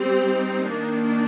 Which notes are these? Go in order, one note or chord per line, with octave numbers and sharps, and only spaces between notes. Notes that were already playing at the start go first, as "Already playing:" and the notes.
Already playing: G3 C4
D#4
D#3 A#3 D4